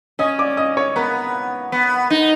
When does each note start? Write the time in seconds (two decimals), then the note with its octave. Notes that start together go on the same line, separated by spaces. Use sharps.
0.19 C#4 D#5 D#6
0.38 D5 D6
0.57 D#5 D#6
0.77 C#5 C#6
0.96 B3 A#4 A#5
1.72 B3
2.10 D#4